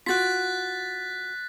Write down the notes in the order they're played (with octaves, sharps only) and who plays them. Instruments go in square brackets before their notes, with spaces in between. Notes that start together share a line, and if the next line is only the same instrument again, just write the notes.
[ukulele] F4 F#4 [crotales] F#6 A6 B6